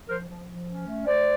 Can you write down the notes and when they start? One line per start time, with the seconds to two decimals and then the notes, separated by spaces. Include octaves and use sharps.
0.08 F3 A#4 C5
0.28 F3
0.48 F3
0.67 C#4
0.87 A3
1.06 A3 C5 D5